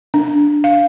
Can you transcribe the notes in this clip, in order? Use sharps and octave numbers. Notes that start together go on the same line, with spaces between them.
D4
F5